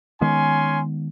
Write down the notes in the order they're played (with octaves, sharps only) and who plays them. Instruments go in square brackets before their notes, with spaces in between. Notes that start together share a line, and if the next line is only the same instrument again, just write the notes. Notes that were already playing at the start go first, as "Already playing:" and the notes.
[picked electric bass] D#3 G#3 B3 [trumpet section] C#4 G#5 C6